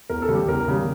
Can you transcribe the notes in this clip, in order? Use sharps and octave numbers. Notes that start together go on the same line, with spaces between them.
E2 A#4
A4
C#3 G3
G4
E2 A#4
C#3 G3